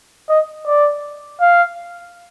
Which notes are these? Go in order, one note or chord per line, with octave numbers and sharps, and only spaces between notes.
D#5
D5
F5